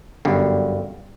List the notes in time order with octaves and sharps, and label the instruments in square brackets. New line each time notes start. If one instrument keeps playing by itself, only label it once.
[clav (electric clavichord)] G1 F#2 D3 G3